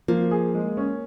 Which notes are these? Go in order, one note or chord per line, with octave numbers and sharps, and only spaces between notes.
F3 A#3
G#4
G#3
C#4